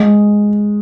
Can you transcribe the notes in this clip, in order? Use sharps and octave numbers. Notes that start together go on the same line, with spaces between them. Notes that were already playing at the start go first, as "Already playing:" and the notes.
Already playing: G#3